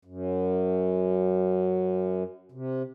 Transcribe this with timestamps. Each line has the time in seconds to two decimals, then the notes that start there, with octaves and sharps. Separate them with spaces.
0.05 F#2
2.52 C3